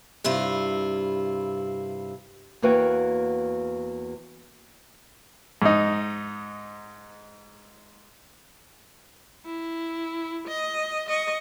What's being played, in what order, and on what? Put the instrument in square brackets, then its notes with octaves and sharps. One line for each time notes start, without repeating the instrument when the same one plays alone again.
[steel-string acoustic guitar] G2 C3 E4 F4
[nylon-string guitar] E2 A#3 F#4 B4 C#5 G5
[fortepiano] G#2 D#4
[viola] E4
D#5
D#5 C#6